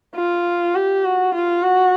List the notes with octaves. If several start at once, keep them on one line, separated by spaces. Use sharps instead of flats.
F4
G4
F#4
F4
F#4